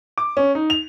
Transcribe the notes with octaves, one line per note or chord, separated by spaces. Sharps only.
D6
C#4
D#4
F7